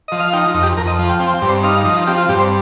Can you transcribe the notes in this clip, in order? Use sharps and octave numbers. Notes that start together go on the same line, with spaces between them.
F3 D#5
F5
D#4 G5
F4
F2
G4
F2 A#4
D#5
F3
G5
C4 G5
G5
G2
C5
D#4 F5
F3
C4 G4
F4
G2 G4
C5